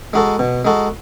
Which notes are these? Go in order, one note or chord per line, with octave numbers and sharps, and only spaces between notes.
G#3 D#4 F#4 A4
B2
G#3 D#4 F#4 A4